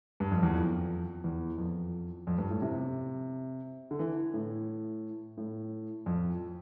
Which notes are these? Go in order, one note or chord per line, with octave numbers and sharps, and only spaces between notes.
G2
F2
E2
F2
E2
F2
F2
G2
A2
C3
D3
E3
A2
A2
F2